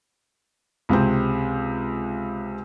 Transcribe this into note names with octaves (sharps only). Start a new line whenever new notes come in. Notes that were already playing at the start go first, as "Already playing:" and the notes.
C#2 C3 C4